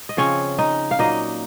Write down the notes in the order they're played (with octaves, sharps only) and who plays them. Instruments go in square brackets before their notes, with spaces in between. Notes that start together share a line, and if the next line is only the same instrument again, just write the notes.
[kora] D#5
C#3 F3 C4 C#4 C#5
D#4 D#5
F5
A#2 F#3 A#3 D#4 D#5